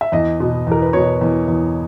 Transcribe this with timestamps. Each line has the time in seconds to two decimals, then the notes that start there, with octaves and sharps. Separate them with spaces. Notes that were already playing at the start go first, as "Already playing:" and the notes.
0.01 E5
0.12 E2 D#5
0.40 B2
0.67 E2 A#4
0.82 B4
0.93 B2 C#5
1.21 E2
1.48 E2